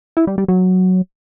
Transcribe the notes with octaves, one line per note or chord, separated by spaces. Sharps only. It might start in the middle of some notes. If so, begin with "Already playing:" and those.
E4
G3
G3
F#3